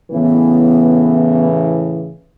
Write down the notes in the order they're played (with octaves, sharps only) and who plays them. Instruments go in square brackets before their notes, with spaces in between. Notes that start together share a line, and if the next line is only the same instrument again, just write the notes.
[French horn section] A2 C#3 E3 [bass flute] B3